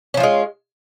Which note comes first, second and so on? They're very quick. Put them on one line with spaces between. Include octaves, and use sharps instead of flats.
C#4 F3 F4 G#3